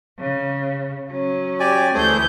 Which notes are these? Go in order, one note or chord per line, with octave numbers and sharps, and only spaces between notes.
C#3
F#3 C#4
G4 D5 G#5
D2 E3 A3 G#4 C5 G6